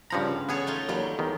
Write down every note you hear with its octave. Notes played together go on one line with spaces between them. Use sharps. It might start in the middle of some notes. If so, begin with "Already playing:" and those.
G2 C#3 F3 F#5 A#5 B5
B3 F#4 G#4 A4 C#5 F#5
A3 D#4 F4
D#2 F#3 G3
E2 D#3